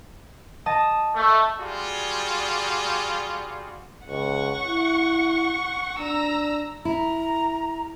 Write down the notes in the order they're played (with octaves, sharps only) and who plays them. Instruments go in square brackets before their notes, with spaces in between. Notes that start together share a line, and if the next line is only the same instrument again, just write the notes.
[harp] D#5 A5 D#6
[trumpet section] A3
G3 F4 F#4 G#4 D5
[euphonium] C#2 [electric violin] F#5 C#6
[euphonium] E4
[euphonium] D4 [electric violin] A#5 E6
[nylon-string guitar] E4 [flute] A#5